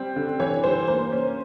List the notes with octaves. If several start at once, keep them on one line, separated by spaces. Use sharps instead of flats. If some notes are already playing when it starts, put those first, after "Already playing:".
Already playing: G3 C4
D3
E3 C#5
G3 C5
A#3 C5
C#4